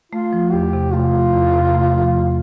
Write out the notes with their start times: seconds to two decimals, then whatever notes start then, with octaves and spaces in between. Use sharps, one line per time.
0.12 A3 F4
0.33 F3
0.52 E2 G4
0.73 C3
0.93 A3 F4
1.13 F3
1.33 E2
1.54 C3
1.74 A3
1.94 F3
2.15 E2